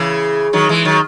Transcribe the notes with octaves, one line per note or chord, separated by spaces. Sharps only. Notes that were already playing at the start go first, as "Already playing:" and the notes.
Already playing: C#3 E3
D#3 F#3
E3 G#3
D#3 F#3